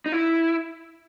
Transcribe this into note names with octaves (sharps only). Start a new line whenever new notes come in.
D#4
E4